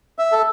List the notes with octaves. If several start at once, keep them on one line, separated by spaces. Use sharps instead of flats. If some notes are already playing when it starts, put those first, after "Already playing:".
E5
A4